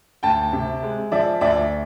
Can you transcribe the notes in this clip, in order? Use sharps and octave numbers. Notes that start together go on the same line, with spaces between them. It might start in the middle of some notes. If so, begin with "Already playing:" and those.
D2 G5 A5
C3
G#3
F3 D5 E5
D2 D5 E5